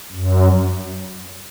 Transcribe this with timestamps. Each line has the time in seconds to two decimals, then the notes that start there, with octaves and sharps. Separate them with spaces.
0.12 F#2